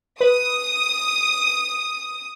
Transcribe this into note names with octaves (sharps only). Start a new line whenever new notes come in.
B4 D#6